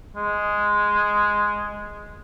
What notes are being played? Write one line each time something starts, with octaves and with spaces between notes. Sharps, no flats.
G#3